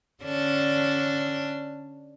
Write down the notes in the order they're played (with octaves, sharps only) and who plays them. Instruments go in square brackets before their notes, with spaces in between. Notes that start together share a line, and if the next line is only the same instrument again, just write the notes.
[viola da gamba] D3 C#4 D4